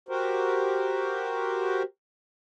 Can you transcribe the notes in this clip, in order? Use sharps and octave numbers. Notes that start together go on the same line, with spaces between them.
F#4 G4 A#4 C5